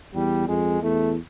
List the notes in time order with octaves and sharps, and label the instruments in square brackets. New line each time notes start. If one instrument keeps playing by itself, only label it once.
[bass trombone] E2 [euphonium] G3
[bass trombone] F2 [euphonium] G#3
[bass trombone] E2 [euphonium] A3